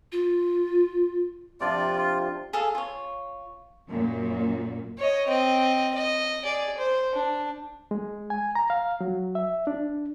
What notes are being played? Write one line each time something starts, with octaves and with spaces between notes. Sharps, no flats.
F4
C3 F3 D4 F4 D5
F4
G#4 A4 F5
F4 C#5
F#2 A#2
C#5 D#5
C4 D#5
D#5
G#4 D5
C5
D4
G#3
G#5
A#5
F5
F#3
E5
D4